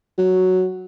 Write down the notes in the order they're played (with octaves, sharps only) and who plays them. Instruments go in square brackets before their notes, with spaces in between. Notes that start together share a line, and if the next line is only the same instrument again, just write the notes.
[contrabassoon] F#3